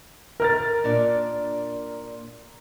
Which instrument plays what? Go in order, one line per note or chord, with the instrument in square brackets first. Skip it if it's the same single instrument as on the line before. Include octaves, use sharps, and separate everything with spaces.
[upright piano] A#4 F6 A6
[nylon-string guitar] A#2 D4 D5